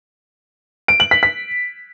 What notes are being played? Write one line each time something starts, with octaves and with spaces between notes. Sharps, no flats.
D7
F#7
B6
B6